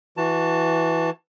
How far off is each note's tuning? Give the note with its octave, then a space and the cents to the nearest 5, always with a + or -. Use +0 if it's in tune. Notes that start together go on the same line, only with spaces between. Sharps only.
E3 +0 F#4 -10 A5 +15